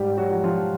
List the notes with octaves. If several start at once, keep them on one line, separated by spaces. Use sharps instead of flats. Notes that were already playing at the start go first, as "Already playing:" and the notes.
Already playing: G#2 G3 G4
F#3 F#4
F3
F3 F4